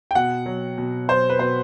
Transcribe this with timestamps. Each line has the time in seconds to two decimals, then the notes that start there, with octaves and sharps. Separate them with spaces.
0.11 G5
0.15 B2 F#5
0.46 F#3
0.78 B2
1.08 F#3 C5
1.30 B4
1.39 B2 C5